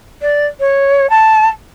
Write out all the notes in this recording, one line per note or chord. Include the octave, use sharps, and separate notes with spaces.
D5
C#5
A5